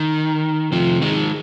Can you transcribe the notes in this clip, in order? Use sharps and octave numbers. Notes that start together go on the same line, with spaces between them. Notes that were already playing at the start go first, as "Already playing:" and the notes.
Already playing: D#3
C3 F3
D#3 G#3